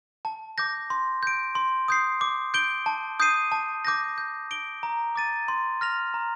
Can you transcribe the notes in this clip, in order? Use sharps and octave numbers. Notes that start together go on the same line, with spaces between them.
A5
D6 G6 A#6
C6
G6 D7
C6
D#6 G6 C7
D6
G6 D7 G7
A5
D#6 G6 C7 D#7
A5
D6 G6 A#6
G6
D7 G7
A#5
D6 A6 D#7
C6
F6 A#6 F7
A#5